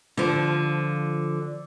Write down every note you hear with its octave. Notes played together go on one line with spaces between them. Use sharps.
D3 F3